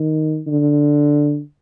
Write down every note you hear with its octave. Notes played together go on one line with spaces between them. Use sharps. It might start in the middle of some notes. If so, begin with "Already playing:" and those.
Already playing: D#3
D3